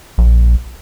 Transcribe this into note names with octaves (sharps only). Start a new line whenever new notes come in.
A#1